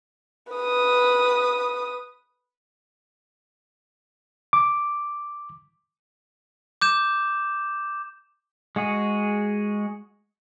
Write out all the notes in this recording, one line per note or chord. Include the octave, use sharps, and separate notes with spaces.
B4 D#6
D6
D6 G6 E7
G#3 F#4 G#4